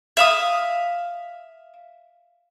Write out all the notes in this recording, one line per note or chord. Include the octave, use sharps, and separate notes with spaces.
E5 F5 D#6